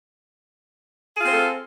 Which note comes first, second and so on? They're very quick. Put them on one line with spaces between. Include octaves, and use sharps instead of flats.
G#4 F4 C4 C5 A4